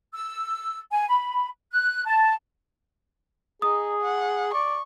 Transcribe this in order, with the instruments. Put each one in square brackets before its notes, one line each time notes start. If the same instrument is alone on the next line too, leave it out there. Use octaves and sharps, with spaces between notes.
[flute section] E6
G#5
B5
F#6
A5
[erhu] D#4 [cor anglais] G#4 [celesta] D#6
[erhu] F#5
[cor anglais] D5 [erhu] C#6